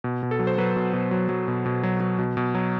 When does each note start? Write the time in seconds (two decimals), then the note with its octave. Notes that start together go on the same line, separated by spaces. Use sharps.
0.04 B2
0.23 B2
0.31 A4
0.39 F#3
0.47 C5
0.58 F#3 B4
0.76 B2
0.93 B2
1.11 F#3
1.29 F#3
1.48 B2
1.66 B2
1.83 F#3
2.00 F#3
2.19 B2
2.37 B2
2.55 F#3